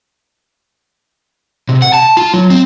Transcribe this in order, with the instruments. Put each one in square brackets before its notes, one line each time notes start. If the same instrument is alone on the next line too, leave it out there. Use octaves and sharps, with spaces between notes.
[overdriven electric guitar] C3
F#5
A5
F4
F#3
C4